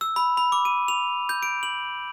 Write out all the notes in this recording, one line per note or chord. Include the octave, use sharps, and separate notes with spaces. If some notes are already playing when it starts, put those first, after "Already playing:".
E6
B5
B5
D6
D#7
F7
G6
D7
F#7